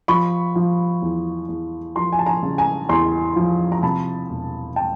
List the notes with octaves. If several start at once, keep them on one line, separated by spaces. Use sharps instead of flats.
F3 B5 C#6
F3
E2
E2
F3 A#5 C6
G#5
A5
G#5 A#5
C#3
G#5 A#5
E2 A#5 C6
F3
A#5
C3 A5 B5
E1
G5 A5